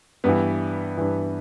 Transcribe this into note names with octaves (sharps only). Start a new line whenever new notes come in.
G2 E3 B3
G2 E3